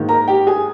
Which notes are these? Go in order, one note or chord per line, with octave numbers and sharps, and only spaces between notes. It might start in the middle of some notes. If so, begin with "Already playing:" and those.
Already playing: G#2 D#3 A#3
A#4 A#5
G4 G5
G#4 G#5